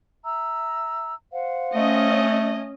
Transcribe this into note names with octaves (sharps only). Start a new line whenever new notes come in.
E5 A#5 E6
C5 F5 F#5
A3 C#4 D#5